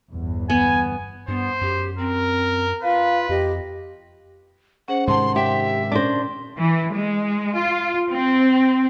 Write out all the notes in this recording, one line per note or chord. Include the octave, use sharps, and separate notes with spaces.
G1 E2
B3 G#5
G2 B3 C5
F#2 G4
C4 A#4
F4 B4 F5
F2 G4 D#5
C#4 G#4 C5 F#5
G#2 C3 D#3 C5 F#5 A5 C6
G4 E5
A#2 C#4 D4 C5 A#6
E3
G#3
F4
C4